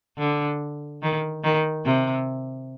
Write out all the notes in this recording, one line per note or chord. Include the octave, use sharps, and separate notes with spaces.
D3
D#3
D#3
C3